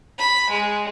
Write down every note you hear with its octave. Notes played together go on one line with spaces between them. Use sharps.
B5
G#3